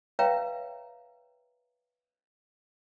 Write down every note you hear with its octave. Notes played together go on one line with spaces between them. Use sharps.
B4 C#5 E5 F5 G5 A#5